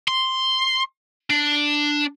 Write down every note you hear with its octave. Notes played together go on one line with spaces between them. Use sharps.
C6
D4